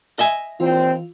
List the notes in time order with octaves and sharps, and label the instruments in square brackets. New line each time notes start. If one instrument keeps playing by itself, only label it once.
[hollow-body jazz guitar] D#5 E5 G#5
[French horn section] D#2 A#2 C4 [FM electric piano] E3 F4